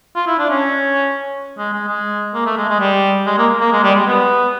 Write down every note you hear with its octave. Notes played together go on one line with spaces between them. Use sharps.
F4
E4
D4
C#4
G#3
G#3
G#3
A#3
A3
G#3
G#3
G3
G#3
A#3
A#3
G#3
G3
G#3
B3